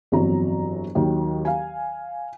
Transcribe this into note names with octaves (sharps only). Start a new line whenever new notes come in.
G1 F2 E3 F#3 A#5
D#2 D#3 F#3
F5 G#5